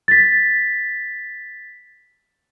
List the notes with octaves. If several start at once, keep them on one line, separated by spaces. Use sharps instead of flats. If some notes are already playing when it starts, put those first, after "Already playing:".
A6 B6